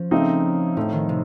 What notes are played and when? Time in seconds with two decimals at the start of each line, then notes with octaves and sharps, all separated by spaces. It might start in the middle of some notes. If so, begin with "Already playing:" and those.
Already playing: F3 C#4
0.11 C#3 A3 C4 D#4
0.77 A2 F3 A3 D#4
0.93 D#3
1.09 C3